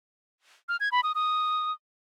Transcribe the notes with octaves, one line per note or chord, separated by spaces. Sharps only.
F6
G#6
B5
D#6
D#6